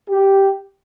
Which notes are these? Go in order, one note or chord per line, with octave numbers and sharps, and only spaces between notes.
G4